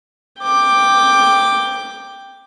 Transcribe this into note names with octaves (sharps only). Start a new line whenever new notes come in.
G5 D6